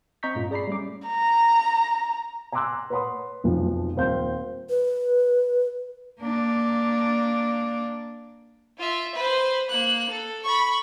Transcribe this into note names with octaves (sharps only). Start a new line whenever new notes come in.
C4 D#5 A#5 C#6 G6 B6
G2 A#2 A3 C#4 F4
G#4 D5 A#5 B5 C7
G3 A3 C#4 D6
A#5
G#5 A#5 C6 D6 E6 F#6
B4 C#5 F#5 B5 C6 D#6
F1 B1 C3 F3
D#1 C4 C5 F5 C6 G6
B4
A#3 D4
F4 E5
B4 C5
A#3 F#6
A4
B5 C#6